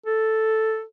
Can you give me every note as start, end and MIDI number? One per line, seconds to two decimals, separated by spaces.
0.06 0.83 69